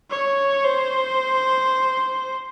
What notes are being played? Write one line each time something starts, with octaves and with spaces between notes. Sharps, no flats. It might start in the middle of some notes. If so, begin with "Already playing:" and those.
C#5
C5